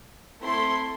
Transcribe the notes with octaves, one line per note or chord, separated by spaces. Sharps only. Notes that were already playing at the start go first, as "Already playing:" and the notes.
A3 C4 E4 A4 C6